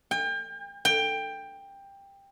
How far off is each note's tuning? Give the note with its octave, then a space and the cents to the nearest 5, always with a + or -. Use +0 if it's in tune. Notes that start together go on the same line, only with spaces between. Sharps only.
G5 +35
G5 +15